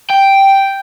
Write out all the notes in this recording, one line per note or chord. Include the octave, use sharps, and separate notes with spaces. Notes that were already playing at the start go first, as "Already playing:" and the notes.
G5